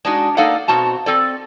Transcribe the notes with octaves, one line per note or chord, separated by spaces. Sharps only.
G#3 D4 D#4 F#4
A#3 D#4 A4 D5 F5 F#5
B2 C4 F#4 A5 A#5
C4 A4 D5